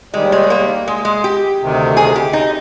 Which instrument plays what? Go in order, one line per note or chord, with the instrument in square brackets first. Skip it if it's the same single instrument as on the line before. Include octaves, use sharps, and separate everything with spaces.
[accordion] D#2 D#3 G3 [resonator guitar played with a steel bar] G#3
[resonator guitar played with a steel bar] G#3
A#3
G#3
G#3
G4
[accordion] D2 C3 D#3
[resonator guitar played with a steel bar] G#4
G4
D#4